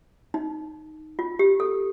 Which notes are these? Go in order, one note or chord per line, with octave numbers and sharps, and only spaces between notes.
D#4
F4
G4
A4